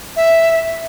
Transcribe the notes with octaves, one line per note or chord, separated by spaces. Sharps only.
E5